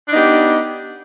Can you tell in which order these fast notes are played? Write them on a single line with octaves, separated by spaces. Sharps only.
D4 D#4 B3 G4